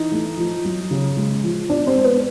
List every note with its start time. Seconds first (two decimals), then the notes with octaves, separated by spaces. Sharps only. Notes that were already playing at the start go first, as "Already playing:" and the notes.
Already playing: E3 D#4
0.12 A3
0.38 F3
0.65 F#3
0.91 C#3
1.17 G#3
1.44 F3
1.69 B3 D4 D5
1.87 C4 C5
1.95 G#3
2.04 B3 B4